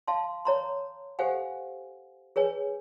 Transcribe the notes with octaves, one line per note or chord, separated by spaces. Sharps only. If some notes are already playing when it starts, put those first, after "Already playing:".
F5 A5 C6
C#5 A#5 C6
G4 A4 C5 F5 F#5 G#5
G#4 B4 C#5 G#5